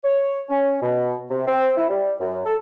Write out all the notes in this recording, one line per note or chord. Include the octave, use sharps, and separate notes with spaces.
C#5
C#4
B2
C3
C4
E4
G3
F#2
A4